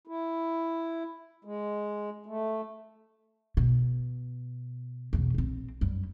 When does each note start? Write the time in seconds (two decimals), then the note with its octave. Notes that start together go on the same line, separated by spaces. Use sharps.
0.07 E4
1.45 G#3
2.26 A3
3.57 B2
5.13 E2 B2
5.34 A#1 C4
5.81 F#2 G3